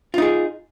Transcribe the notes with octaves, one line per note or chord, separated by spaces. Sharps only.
D#4 F4 G#4